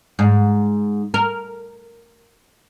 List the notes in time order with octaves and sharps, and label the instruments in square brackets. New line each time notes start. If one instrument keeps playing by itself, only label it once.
[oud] G#2
A#4